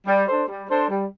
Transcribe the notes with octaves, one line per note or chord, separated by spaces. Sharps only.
G3
D4 A4 C5
G3
D4 A4 C5
G3